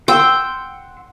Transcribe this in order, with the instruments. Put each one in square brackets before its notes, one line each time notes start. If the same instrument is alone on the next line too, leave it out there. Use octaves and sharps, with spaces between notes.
[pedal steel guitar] F#5 C6 E6 [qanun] G5